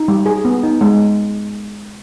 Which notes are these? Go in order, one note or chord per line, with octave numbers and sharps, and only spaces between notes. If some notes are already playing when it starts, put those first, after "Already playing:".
Already playing: D#4
G3
G#4
B3
D#4
G#3